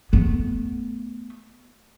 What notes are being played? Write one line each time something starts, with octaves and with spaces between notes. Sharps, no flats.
A3 B3